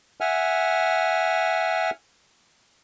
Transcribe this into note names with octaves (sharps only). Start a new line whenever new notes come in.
E5 F#5 G#5 F6